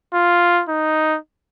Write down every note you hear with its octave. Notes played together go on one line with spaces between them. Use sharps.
F4
D#4